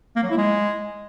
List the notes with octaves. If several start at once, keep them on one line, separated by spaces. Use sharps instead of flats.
A#3
F#3
E4
G#3